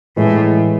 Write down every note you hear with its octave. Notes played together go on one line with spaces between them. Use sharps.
A2 E3 G#3